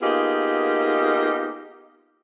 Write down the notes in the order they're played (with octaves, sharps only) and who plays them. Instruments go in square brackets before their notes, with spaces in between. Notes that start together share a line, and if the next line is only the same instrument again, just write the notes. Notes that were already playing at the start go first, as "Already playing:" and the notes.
[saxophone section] A#3 B3 D#4 F4 G4 G#4